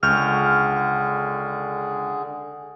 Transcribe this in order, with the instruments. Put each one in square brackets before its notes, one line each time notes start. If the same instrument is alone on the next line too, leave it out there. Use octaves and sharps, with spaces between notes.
[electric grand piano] C#2 C#6 G6 [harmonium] D3 G#4 [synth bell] F6